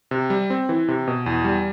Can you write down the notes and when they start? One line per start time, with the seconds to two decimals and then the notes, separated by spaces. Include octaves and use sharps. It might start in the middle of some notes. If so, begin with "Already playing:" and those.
0.11 C3
0.30 G3
0.50 C4
0.69 E3
0.88 C3
1.07 B2
1.26 E2
1.44 G3